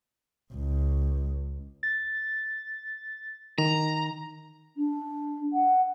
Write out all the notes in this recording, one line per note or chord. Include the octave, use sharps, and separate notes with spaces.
C#2
A6
D#3 A#5
D4
F#5